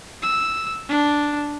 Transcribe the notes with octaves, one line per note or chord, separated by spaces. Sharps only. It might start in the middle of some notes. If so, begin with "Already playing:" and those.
E6
D4